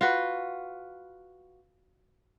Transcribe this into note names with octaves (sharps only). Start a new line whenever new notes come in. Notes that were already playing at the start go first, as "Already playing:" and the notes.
F4 F#4 B4